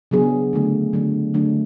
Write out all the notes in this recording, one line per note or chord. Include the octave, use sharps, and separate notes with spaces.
C#3 F#3 B3 D4 G#4
D3 F#3 A3 D4
D3 F#3 A3 D4
D3 F#3 A3 D4